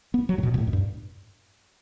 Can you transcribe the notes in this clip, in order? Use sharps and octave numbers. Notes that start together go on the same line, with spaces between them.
B3
F#3
A2
B2
B2
A2
F#2
G2